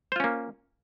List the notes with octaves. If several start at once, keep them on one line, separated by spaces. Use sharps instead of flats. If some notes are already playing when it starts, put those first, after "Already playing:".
A#3 C#4 F4 C5